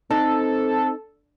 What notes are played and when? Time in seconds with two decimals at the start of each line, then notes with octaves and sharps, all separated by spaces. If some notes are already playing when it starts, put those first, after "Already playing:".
0.10 C4 D#4 A4